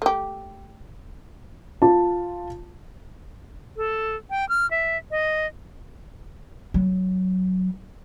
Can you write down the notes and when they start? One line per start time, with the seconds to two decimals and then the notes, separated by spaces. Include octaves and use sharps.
0.02 A3 G4
1.82 F4 A5
3.77 A4
4.30 G5
4.49 F6
4.71 E5
5.11 D#5
6.74 F#3